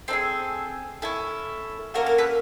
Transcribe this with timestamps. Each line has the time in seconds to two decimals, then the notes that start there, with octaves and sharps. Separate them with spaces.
0.08 C4 D#4 A4
0.13 G#4
1.02 C#4 E4 A4
1.94 A#3 C#4 F#4 A4 A#4
2.06 A#4
2.18 A4 B4